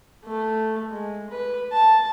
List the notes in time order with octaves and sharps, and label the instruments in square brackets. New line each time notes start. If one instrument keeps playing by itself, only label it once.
[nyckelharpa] A3
G#3
B4
A5